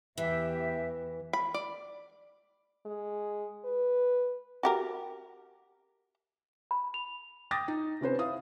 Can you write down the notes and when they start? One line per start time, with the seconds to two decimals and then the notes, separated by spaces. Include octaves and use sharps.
0.18 E2 E3 G4 E5
1.33 B5
1.54 D5
2.86 G#3
3.65 B4
4.63 F#4 G4 A#4
6.71 B5
6.94 F7
7.51 G5 D6 D#6 A6 A#6
7.68 D#4
8.01 C3 C#4 B4 C5
8.19 E4 F5 D#6